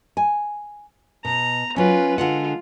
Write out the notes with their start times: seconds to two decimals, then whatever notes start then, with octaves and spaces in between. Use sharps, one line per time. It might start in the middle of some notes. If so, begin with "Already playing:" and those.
0.17 G#5
1.25 B2 A#5
1.76 F#3 C#4 F4 B4
2.18 D3 G#3 F4 F#5